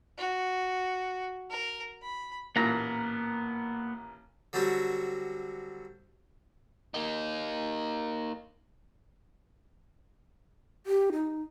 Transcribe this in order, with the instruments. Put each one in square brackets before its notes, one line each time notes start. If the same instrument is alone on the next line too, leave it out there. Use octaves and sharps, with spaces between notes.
[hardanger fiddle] F#4
A#4
B5
[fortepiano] A1 A#2 [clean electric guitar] A#3 B3 A#5
[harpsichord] D3 F#3 G3 C4 F#4
[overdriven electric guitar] A#3 D#4
[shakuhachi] G4
D#4